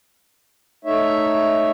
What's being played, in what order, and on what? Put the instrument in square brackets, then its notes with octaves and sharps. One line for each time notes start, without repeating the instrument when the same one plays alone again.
[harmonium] A3 D#4 C#5 E5